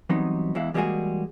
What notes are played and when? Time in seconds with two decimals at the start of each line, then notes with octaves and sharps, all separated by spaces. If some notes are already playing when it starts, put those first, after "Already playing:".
0.10 E3 F#3 G3 B3 C4 D#4
0.55 E2 E3 G#3 E4 F5
0.74 E3 G3 G#3 A#3 F#4 G#4